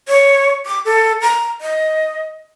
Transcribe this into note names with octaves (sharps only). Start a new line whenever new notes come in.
C#5
D6
A4
A#5
D#5